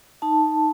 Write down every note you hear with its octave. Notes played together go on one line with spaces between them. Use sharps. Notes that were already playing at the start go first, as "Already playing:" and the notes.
D#4 A5